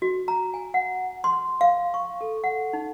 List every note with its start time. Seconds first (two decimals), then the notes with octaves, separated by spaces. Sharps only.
0.02 F#4
0.28 A#5
0.54 G#5
0.74 F#5
1.24 C6
1.61 F5
1.94 C#6
2.21 A4
2.44 F#5
2.73 D#4